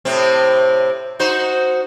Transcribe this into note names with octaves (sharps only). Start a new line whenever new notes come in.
A2 C3 C4
D#4 F#4 C5